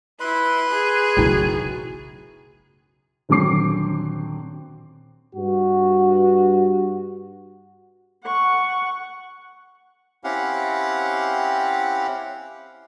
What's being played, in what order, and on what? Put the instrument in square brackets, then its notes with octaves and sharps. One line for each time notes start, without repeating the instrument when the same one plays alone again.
[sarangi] E4 [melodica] B4 B5 C6
[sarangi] G#4
[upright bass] B1 C#3 [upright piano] F#2 A2 E3
[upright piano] D#1 D3 F#3 C4 D6 C7
[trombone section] G2 F#4
[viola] F#5 C#6
[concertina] C4 C#4 E4 G4 F5 F#5